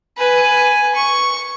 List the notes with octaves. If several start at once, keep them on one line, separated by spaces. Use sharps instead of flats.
B4 G#5
C#6